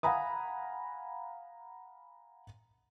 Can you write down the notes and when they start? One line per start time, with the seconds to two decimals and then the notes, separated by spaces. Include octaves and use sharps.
0.03 F5 F#5 G#5 A#5 B5 D#6